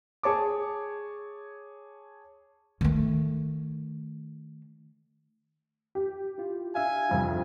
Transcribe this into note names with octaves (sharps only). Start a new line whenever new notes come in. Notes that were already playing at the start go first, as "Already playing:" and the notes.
G#4 C#5 A5 D6
D#3 A3
G4
E4 F4
D4 E5 F5 G#5
C2 F2 F4